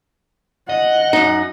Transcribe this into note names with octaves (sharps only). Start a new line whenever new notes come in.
D#5 F#5
F#2 D#4